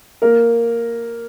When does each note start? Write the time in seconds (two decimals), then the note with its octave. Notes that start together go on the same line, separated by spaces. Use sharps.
0.22 A#3 A#4